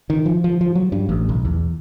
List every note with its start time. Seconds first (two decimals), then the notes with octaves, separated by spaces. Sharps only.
0.10 D#3
0.26 F3
0.44 F3
0.61 F3
0.75 F#3
0.92 G2
1.09 A1
1.29 B1
1.45 E2